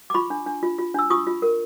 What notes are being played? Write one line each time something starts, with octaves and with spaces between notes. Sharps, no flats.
D6
F4 B5 C#6
D4
D4
F4
F4
D4 E6
F4 C#6 D#6
F4
A#4